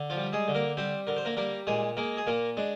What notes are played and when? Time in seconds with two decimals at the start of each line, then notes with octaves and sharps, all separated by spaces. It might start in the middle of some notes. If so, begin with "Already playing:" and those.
Already playing: D3
0.10 F3 F4
0.17 G3
0.33 G#3 G#4
0.48 D3
0.55 A#3 A#4
0.77 G3 C4 C5
1.07 D3 A#4
1.17 C5
1.25 A#3 A#4
1.37 G3 A#3 A#4
1.67 A#2 G#3 G#4
1.97 G#3 A#3 A#4
2.17 G#4
2.27 A#2 A#3 A#4
2.57 G#3 D4